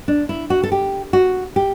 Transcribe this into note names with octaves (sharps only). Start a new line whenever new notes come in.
D4
E4
F#4
A4
G4
F#4
G4